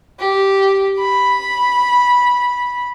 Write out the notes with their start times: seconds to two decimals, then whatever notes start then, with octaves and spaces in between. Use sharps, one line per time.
0.19 G4
0.99 B5